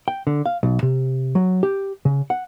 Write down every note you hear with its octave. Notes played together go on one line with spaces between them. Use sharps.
G5
D3
F5
B1
C3
F#3
G4
C#3
F#5